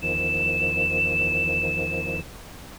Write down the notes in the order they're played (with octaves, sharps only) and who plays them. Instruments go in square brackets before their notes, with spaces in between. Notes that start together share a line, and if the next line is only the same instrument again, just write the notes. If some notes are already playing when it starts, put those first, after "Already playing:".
[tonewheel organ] E2 D#3 F3 [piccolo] E7